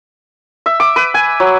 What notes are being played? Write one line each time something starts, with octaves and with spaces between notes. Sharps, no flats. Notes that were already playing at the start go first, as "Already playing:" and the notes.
E5
D6
B4
G#5
F#3